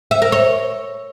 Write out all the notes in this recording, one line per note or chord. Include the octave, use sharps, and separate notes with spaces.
E5
A#4
C#5